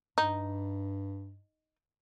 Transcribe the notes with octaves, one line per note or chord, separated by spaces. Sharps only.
G2 D#4